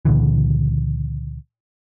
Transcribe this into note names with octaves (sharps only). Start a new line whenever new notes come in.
C#2 A#2 D3 E3